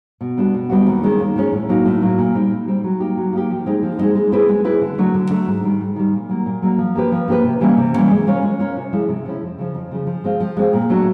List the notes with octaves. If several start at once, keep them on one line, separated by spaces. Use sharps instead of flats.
B2
G3 B3 D4 F#4
B2
G3 B3 D4 F#4
D#2
D#3 G#3 C#4
D#2
D#3 G#3 C#4
A2
F#3 A#3 D#4
A2
F#3 A#3 D#4
A#2
G3 C4 D#4
A#2
G3 C4 D#4
F#3
A#3 D#4 G4
F#3
A#3 D#4 G4
F3
G#3 C4 D#4
F3
G#3 C4 D#4
G#3
C4 E4 G#4 B4
G#3
C4 E4 G#4 B4
D3
F#3 A3 D4
D3
F#3 A3 D4
G#2
D#3 G3
G#2
D#3 G3
A#2
F#3 A#3
A#2
F#3 A#3
F3
A#3 D4 G4 B4
F3
A#3 D4 G4 B4
C3
E3 G3 A#3 C#4
C3
E3 G3 A#3 C#4
G#3
C#4 F4 A#4 C#5
G#3
C#4 F4 A#4 C#5
C3
F3 G#3 C#4 E4
C3
F3 G#3 C#4 E4
F2
C#3 F3
F2
C#3 F3
F3
G#3 C4 F4
F3
G#3 C4 F4
A#2
F#3 A3 D4